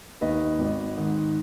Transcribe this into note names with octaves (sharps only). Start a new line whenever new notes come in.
D#2 D#3 B4 D#5
G#1
G#2 D#3